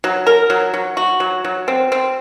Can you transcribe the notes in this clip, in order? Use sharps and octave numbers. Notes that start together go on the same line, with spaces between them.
F#3
A#4
F#3
F#3
F#4
F#3
F#3
C4
C4